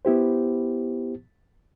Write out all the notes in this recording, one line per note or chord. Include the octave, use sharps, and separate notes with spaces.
B3 E4 G4 C5